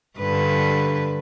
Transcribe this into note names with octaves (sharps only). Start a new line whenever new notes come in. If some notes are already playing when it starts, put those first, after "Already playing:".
G2 D3 B4